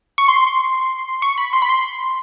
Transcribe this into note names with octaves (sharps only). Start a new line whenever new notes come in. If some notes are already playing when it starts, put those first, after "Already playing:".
C#6
C6
C#6
B5
C6
B5
C6